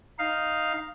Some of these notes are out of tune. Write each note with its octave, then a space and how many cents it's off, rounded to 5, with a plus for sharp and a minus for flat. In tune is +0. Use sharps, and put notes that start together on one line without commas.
D#4 +0 F5 +0